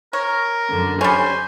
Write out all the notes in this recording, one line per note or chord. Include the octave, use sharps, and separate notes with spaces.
A#4 C#5
F#2 D3
G3 C#4 C5 G#5